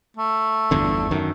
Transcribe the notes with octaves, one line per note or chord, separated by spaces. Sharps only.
A3
G1 E2 D3
F#2 D#3